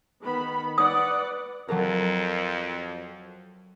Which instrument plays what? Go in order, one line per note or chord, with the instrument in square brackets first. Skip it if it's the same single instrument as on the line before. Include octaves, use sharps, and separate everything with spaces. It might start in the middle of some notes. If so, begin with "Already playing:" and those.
[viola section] D#3 B3 B5
[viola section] B4 D5 F#5 [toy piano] D#6
[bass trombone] F2 [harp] F#3 A4 A#4